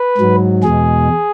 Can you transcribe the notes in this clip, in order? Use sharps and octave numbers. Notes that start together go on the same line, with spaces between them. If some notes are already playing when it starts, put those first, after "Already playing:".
Already playing: B4
G#2 F#3
E2 B2 G#3 G#4